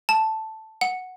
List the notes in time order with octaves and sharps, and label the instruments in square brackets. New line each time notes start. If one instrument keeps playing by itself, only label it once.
[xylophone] A5
F#5